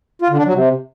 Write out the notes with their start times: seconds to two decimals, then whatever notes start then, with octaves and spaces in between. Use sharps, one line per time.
0.22 F4
0.30 D3
0.38 D4
0.46 F#3
0.54 C3